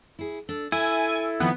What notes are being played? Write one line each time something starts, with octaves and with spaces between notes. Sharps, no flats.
E4 G#4
D4 A4
E4 A4 E5 G#5
D#3 F3 B3 C4